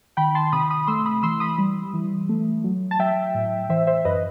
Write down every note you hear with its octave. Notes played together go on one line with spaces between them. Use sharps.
D#3 G5 B5
A5 C6
C3 B5 D#6
B5 D#6
A3 C6 E6
B5 D#6
E3 C6 E6
B5 D#6
G3
E3
A3
F#3
A5
F#3 E5 G5
A2
E3 C5 E5
C5 E5
F#2 B4 D#5